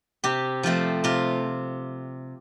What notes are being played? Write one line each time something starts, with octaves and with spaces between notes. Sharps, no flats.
C3 G4
F3 A3 C4
C3 F4